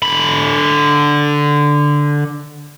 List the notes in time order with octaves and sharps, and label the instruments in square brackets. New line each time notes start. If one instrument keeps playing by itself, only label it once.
[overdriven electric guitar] D3 B5